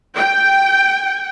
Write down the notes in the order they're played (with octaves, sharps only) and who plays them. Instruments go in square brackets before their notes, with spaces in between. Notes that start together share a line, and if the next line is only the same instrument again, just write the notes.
[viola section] G5